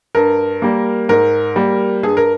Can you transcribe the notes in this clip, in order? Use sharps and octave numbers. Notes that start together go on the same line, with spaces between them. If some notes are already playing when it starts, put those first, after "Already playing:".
G2 A#4
G3 A#3
G#2 A#4
G3 A#3
G2 G#4
A#4